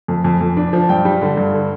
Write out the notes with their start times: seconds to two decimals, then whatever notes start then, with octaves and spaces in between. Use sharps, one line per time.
0.08 F2
0.24 F2
0.41 F2
0.57 D4
0.73 F3
0.89 G2 G5
1.05 G3
1.21 D3
1.37 G2
1.54 D3